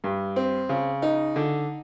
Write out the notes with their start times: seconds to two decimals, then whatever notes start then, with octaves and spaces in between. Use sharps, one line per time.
0.04 G2
0.36 C4
0.69 C#3
1.02 D#4
1.36 D3